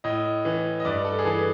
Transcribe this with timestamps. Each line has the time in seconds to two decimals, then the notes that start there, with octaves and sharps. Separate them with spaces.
0.04 A2 D#5
0.45 E3
0.80 D#5
0.85 G2 D5
1.05 A4
1.19 G#4
1.25 E3 A4